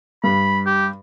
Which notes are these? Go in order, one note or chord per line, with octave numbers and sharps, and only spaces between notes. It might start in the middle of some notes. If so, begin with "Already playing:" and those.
G2 B5
G4